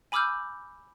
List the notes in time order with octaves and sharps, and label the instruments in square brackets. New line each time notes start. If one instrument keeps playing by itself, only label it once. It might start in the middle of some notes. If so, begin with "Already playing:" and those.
[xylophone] G#5 B5 D6 E6 F6 G6